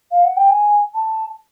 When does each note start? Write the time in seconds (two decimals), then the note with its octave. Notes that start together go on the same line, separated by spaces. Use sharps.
0.11 F5
0.24 F#5
0.37 G5
0.50 G#5
0.94 A5